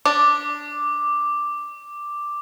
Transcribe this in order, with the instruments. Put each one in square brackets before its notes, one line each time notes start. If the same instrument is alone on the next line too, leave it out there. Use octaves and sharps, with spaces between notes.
[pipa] D4 [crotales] D6